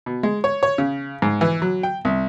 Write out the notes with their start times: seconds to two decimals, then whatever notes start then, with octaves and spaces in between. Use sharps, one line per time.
0.06 B2
0.23 G#3
0.44 C#5
0.63 C#5
0.78 C#3
1.22 G#2
1.41 E3
1.62 F#3
1.83 G5
2.05 C2